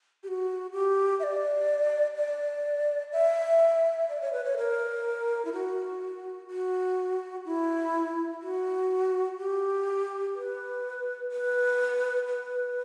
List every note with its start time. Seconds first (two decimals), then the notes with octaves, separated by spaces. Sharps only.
0.23 G4
0.28 F#4
0.72 G4
1.20 E5
1.23 D5
2.16 D5
3.13 E5
4.09 D5
4.21 C#5
4.33 B4
4.44 C#5
4.57 A#4
5.45 E4
5.53 F#4
6.50 F#4
7.45 E4
8.42 F#4
9.38 G4
10.35 B4
11.32 B4
12.28 B4